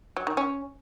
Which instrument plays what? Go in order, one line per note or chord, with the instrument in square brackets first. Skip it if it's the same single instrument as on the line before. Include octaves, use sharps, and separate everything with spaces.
[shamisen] F#3
D#3
C#4